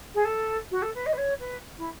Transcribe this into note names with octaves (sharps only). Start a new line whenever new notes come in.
G#4
A4
F#4
A4
B4
D#5
B4
C#5
B4
E4